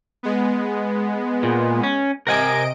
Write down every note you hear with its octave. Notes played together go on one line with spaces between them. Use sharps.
G#3 B3
A#2
C#4
C3 A#4 D#5 F#5 G#5 D7